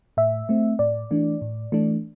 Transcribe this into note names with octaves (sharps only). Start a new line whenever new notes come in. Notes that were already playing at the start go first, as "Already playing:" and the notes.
A2 E5
A3 C4
A2 D5
E3 A3 D4
A2
E3 A3 D4